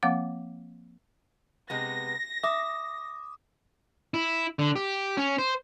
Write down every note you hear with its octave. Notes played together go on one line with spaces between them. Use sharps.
F3 A#3 C4 F5 F#5 D6
C3 G#3 B3 A#6
E5 D6 D#6
E4
D3
G4
C#4
C5